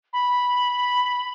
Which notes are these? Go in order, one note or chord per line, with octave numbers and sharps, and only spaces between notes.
B5